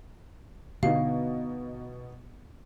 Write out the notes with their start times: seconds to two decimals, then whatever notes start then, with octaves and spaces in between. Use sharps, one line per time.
0.83 B2 D3 B3 D4 D#4 F5